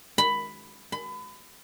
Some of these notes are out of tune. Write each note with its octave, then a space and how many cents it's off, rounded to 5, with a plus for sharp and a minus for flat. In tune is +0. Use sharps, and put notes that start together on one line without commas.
B5 +10
B5 +30